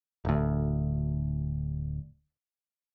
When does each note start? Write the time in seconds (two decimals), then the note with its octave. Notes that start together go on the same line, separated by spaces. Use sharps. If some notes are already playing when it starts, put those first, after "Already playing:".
0.25 D1 D2